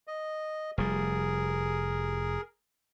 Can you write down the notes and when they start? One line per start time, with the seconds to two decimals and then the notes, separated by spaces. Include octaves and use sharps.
0.07 D#5
0.78 F1 G3 G#4 A#4